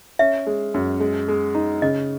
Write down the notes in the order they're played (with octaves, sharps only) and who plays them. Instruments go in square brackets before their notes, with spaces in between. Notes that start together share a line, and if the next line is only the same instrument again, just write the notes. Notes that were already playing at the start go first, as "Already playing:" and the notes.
[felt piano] C#4 [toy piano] E5
[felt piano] G#3
F#2
G#3
G#3
D#4
[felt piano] C#3 [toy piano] D#5